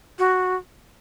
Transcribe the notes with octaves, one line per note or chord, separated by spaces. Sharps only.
F#4